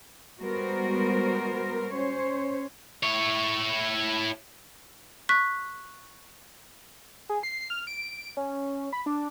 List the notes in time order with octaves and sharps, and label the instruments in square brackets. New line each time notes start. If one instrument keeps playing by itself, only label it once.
[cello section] G3 G#3 B3 F#4 A#4 C5
C#4 C5 C#5
[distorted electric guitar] E4 C#5
[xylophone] C#6 F#6 B6
[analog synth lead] G#4
C7
F6
D7
C#4
B5
D4